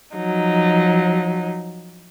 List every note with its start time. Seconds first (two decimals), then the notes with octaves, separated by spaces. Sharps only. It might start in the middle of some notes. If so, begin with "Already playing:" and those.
0.16 F3 F#3 D#4